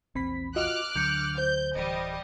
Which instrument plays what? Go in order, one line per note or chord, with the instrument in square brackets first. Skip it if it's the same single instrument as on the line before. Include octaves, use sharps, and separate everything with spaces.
[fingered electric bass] A#1 E2 [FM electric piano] C4 B5 B6
[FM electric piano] F4 F#4 D#5 [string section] D6 F6 F#6
[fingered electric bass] D2 F#3 [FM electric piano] D3 [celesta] G6 C#7
[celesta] C5 [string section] G6
[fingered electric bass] D1 E3 [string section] G3 D#5